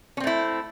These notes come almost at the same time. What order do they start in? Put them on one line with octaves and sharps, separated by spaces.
C#4 C4 A3 E4